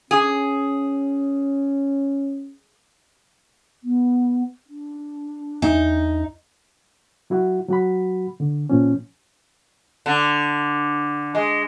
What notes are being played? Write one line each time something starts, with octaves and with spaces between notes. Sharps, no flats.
C#4 G#4
B3
D4
E2 D#4 E5
F#3 E4 F#4
F#3 F#4 B5
D3
A#2 F3 C#4
D3
G#3